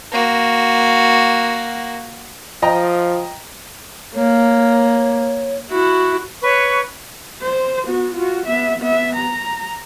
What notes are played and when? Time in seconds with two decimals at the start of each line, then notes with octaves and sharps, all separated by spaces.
0.12 A#3 F#4
2.62 F3 D#5 G5 A#5
4.15 A#3 C#5
5.70 E4 F#4
6.42 B4 C#5 C#6
7.42 C5
7.85 B3 F#4
8.15 F4 F#4
8.46 B3 E5
8.79 B3 E5
9.16 A#5